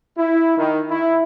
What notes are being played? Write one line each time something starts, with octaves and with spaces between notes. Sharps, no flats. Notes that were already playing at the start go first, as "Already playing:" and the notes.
E4
D#3
E4